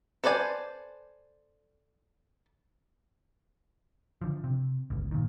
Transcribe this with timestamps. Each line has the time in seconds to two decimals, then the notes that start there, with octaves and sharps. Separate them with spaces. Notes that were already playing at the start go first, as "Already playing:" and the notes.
0.24 A4 B4 C5 D5 G#5
4.21 D3 F3
4.44 C3
4.90 G1 C#2
5.11 A#2 D#3